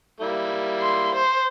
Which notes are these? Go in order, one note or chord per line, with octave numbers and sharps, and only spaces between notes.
G3 A#3 E4
C6
C5